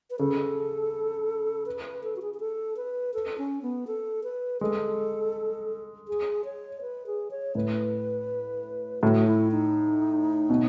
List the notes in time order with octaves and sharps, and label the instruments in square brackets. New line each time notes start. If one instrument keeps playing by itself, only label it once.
[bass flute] B4
[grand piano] C#3 [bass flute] A4
[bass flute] B4
B4
A4
F#4
G#4
G#4
A4
B4
A4
C#4
B3
A4
B4
[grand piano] G#3 [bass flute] A4
[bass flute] G#4
C#5
B4
G#4
C#5
[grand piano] A2 [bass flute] B4
[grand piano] A2 [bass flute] F#4
[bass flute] E4
D#4
[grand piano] B2